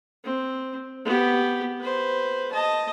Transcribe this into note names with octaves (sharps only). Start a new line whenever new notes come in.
C4
B3 G4
B4 C5
D#5 A5